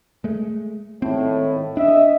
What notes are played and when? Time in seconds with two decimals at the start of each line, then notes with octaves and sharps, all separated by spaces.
0.24 G#3 A3
1.02 G#1 A2 C4
1.77 D4 D#5 E5